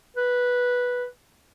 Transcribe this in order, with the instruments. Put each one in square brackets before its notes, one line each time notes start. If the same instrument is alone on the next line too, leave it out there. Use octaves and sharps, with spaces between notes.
[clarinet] B4